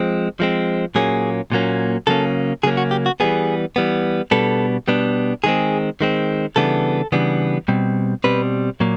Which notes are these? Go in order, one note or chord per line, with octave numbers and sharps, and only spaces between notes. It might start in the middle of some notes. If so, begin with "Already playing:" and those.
Already playing: F3 G#3 C4
F3 G#3 C4
A#2 F#3 A#3 C#4 G#4
A#2 F#3 A#3 C#4
C#3 F#3 A#3 C#4 A4
C#3 F#3 A#3 C#4 G#4
F#4
G4
F#4
E3 G3 B3 G#4
E3 G3 B3
B2 G3 B3 D4 A4
B2 G3 B3 D4
D#3 G#3 C4 G#4
D#3 G#3 C4
C#3 E3 G3 B3 D4 A4
C#3 E3 G3 B3 D4
B2 G3 C4
B2 G3 C4 B4
A#2 F#3 A#3